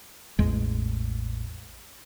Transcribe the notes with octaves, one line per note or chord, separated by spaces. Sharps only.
A1 E2 G#3